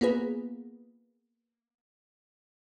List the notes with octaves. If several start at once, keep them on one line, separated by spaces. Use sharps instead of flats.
A#3 B3 F4 G#4 B4